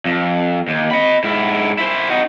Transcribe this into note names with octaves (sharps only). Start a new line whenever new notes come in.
F2
D#2
D#5 B5
G#2 E4
E4 C5
D#4 F#4